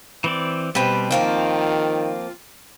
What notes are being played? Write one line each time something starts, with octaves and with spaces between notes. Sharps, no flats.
E3 C4 D5
B2 G3 C4 G4 B4
D#3 F3 A#3 C4 F4